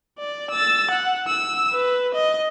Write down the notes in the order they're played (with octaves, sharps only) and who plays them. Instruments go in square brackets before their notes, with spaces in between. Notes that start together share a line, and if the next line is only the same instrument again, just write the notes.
[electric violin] D5
E6 A6
F#5
E6
B4
D#5